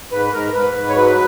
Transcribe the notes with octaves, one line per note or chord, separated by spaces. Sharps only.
G#2 B4
G#2 A#4
G#2 B4
G#2
C#5
F#3 B4